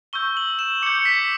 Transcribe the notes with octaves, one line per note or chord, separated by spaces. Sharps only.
C#6 E6 G6 G7
F#7
E7
D6 G6 C#7
C#7
B6